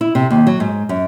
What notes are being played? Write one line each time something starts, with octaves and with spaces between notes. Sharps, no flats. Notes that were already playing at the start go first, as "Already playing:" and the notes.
E4
C3
D#2
F#3
G#2
F#2